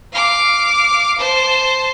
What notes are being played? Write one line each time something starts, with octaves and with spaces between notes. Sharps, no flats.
F5 D6
C5 A5